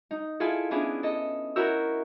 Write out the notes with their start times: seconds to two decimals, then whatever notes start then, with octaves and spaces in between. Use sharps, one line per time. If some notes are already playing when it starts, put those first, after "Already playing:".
0.11 D#4
0.40 E4 F4 G#4 A4
0.71 B3 C#4 D4 E4 G#4
1.03 A4 D#5
1.56 E4 F#4 A#4 C#5 E6 G6